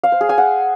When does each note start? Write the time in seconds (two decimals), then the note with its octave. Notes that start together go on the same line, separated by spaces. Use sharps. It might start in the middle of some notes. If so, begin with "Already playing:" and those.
0.04 F5
0.12 C5
0.21 G#4
0.29 G#5
0.38 F#5